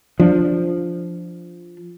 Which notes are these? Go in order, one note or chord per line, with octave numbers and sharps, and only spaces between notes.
F3 D4